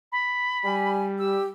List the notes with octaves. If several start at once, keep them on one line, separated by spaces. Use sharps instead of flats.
B5
G3 G#5
G4 E6